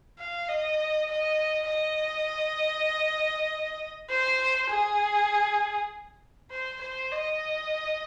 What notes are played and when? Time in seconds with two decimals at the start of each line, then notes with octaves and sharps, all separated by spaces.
0.19 F5
0.49 D#5
1.09 D#5
1.69 D#5
4.10 C5
4.70 G#4
6.51 C5
6.81 C5
7.12 D#5